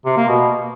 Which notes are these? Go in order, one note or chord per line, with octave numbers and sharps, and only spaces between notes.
C3
A#3
B2